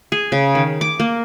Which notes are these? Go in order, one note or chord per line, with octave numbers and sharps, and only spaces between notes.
G#4
C#3
D#3
D6
A#3